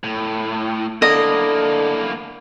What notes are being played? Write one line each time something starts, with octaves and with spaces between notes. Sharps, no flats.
A2
D3 A#3 E4 D#5